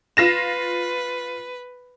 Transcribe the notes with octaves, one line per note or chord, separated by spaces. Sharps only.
F4 B4 A#6 E7